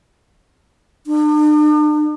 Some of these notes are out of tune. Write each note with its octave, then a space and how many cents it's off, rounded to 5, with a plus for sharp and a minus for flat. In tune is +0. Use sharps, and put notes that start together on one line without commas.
D4 +45